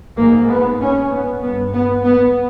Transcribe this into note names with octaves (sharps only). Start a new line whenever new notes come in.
G#2 A#3
B3
C#4
B3
G2 B3
B3
B3